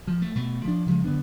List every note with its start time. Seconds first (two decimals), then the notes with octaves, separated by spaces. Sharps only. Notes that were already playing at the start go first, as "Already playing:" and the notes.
0.07 F3
0.22 A3
0.35 B2 A3
0.65 F3 D4
0.86 C#3 F3 G3 G#3
1.04 F#2 D3 B3 D4